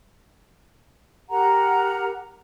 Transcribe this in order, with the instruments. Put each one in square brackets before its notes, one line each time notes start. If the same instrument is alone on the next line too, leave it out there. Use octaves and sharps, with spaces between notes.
[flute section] G4 A#4 F#5 A#5